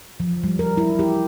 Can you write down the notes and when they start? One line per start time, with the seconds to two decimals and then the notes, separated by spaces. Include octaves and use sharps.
0.20 F3
0.44 G3
0.59 A#4
0.77 E4
0.99 G4